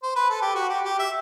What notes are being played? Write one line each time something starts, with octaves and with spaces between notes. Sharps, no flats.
C5
B4
A4
G4
F#4
G4
G4
E5